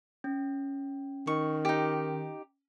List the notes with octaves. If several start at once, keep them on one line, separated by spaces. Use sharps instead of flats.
C#4
D#3 C#6
D#4 G4